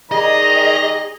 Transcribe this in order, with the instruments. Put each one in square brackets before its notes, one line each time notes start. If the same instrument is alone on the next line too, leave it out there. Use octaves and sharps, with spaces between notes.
[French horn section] D#3 D5 [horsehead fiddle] G#4 [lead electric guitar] D#5 [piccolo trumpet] A#5